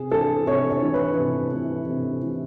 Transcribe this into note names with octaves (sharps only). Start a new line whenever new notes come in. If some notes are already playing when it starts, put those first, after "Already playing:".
Already playing: C3 G#4
E3 A4
C3 C#5
C#5
E3
B4
C3
E3
C3
E3